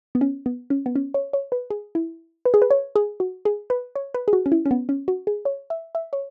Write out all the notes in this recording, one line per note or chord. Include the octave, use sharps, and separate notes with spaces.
B3
C#4
B3
C#4
B3
C#4
C#5
C#5
B4
G#4
E4
B4
G#4
B4
C#5
G#4
F#4
G#4
B4
C#5
B4
G#4
F#4
C#4
E4
C#4
B3
C#4
F#4
G#4
C#5
E5
E5
C#5